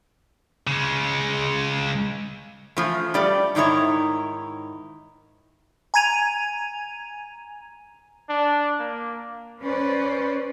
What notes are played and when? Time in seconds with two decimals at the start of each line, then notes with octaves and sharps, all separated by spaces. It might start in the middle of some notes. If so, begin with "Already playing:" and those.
0.67 C#3 G#3
2.77 E3 F3 A3
3.14 G3 A3 G4 D5
3.55 G#2 D#3 D#4 E4 C#5
5.94 G#5 A#5 G#6 D#7 F7
8.29 D4
8.79 A#3
9.62 C#4 B4 C5 D5